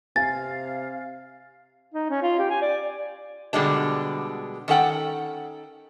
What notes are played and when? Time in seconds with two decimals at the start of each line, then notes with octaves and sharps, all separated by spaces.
0.16 C3 F5 G#5 A6
1.94 D#4
2.10 C#4
2.23 F4
2.39 G4
2.50 G#5
2.62 D5
3.53 B2 D3 G3 G#3 D4
4.68 D#3 C#4 A4 F#5 G5